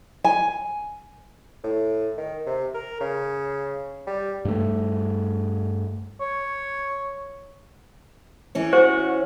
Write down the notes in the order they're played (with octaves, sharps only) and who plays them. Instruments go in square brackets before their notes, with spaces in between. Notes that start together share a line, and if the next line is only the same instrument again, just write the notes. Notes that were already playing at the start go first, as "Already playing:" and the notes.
[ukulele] G#5
[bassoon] A2
D#3
C3
A#4
C#3
G3
[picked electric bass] G2 A3
[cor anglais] C#5
[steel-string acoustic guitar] E3 C#4 C#5
[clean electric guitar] F#4 [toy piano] C5